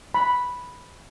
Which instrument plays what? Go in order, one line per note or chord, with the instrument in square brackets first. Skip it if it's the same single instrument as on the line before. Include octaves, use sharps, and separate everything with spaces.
[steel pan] B5